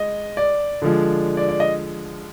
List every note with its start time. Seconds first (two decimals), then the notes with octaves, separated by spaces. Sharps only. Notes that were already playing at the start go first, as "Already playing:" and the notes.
Already playing: G#3 D#5
0.37 D5
0.82 D3 F3 G#3
1.37 D5
1.49 D5
1.60 D#5